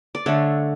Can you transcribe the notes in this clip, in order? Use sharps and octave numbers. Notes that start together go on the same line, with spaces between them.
D5
D3 A3 D4 C#5